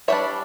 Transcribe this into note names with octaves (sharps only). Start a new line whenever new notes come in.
E3 G3 D4 C#5 E5